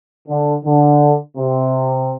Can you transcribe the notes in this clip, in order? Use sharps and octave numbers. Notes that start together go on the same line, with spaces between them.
D3
D3
C3